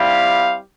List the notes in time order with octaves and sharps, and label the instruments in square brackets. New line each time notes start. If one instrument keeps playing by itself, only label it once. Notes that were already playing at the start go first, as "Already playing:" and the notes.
Already playing: [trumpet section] G3 C4 E4 G4 F5